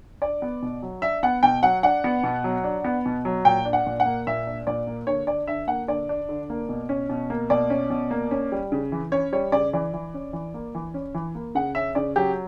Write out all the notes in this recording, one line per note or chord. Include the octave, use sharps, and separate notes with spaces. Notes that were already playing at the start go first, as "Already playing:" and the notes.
D4 D5
B3
B2
F#3
D4 E5
B3 F#5
B2 G5
F#3 F#5
D4 F#5
B3
B2
F#3
D4
B3
B2
F#3
A#2 G5
D4
F#5
A#2
F#5
A#3
A#2 E5
D4
A#2 D5
A#3
D3 C#5
D4 D5
D3 E5
A#3 F#5
D3 D5
D4
D3
A#3
B2
C#4
B2
A#3
B2 D5
C#4
B2
A#3
C#4
G3
C#3
E3
C#4 C#5
G3 C#5
C#3 D5
E3 D5
E3
C#4
E3
A#3
E3
C#4
E3
A#3
C#3 F#5
C#4 E5
C#3 D5
F#3 G4